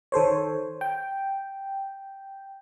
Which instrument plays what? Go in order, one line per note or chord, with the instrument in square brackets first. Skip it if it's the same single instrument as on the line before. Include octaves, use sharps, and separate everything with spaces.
[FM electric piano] D#3 A4 C5 C#5
G5